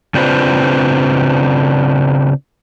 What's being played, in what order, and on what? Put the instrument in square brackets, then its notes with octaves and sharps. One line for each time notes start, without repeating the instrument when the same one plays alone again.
[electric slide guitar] C#3 C4 D4 F4 B4 C5